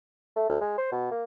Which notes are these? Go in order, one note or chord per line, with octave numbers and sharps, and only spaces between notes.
A3
D2
G#3
C5
B2
A#3